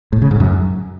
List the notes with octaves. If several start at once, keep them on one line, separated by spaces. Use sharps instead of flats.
A2
C#3
G#2
F#2